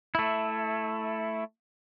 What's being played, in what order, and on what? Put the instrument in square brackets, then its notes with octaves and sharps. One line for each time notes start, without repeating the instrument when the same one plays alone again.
[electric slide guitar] A3 E4